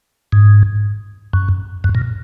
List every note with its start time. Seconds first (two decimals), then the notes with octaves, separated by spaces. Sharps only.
0.32 G#2
1.33 F#2
1.84 F#2
1.95 A#2